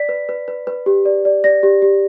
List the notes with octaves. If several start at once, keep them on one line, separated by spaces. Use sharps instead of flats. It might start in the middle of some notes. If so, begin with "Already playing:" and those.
Already playing: D5 B6
B4
B4
B4
B4
G4
D5
D5
D5 A#6
G4
G4